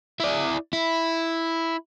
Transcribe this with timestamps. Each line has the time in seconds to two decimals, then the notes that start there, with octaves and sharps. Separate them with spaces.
0.20 E4 D5
0.73 E4